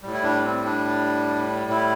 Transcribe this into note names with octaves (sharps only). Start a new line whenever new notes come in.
A2 G3
E4
D4
C4
D4
E4